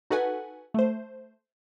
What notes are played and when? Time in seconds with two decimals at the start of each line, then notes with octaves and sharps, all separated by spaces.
0.10 D#4 F#4 A4 B4 F#5 G#5
0.74 A3 C5